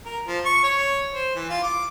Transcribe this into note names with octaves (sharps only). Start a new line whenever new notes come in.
A#4
F3
C#6
C#5
C5
E3
F4
D6